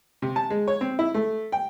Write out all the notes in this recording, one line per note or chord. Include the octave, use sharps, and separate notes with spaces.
C3
A5
G#3
C#5
C4
E4
A3
G5